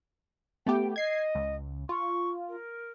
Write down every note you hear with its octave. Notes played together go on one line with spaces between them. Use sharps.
A3 B3 G4 G5
D#5 G#6 C7
C#2
F4 C#6
A#4